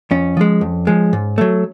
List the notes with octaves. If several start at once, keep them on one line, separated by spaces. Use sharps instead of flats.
F2 C#4
F3 G#3
F2
F3 G#3
G#2
F#3 A3